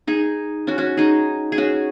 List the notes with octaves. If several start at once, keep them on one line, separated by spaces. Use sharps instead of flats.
D#4 G#4
C#4 F#4
C#4 F#4
D#4 G#4
G#4
C#4 F#4